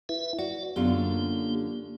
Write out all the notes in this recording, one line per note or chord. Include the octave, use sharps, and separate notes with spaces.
E4 B4 E5
F#4 D5
F#2 D3 B3 F4 G4
A#3